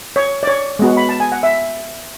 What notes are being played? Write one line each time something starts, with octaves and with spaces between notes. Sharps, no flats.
C#5
D5
C#5
G#3 B3 F#4
B5
A5
G#5
F#5
E5